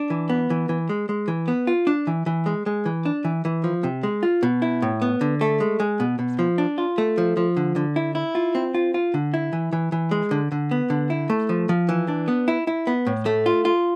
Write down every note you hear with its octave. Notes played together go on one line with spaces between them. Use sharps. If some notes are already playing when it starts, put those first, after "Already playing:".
Already playing: D4
E3
B3
E3
E3
G#3
G#3
E3
B3
F4
D4
E3
E3
G#3
G#3
E3
D4
E3
E3
F3
C3
G#3
F4
B2
E4
A2
B3
D3
A3
G#3
G#3
B2
B2
F3
D4
F4
A3
F3
F3
D3
D3
E4
E4
F4
C4
F4
F4
D3
E4
E3
E3
E3
G#3
D3
D3
B3
D3
E4
A3
F3
F3
E3
D4
B3
E4
E4
B3
A2
A3
F4
F4